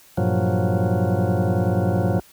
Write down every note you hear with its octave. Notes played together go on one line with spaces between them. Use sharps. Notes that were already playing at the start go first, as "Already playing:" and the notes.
G2 A#2 F3 F#3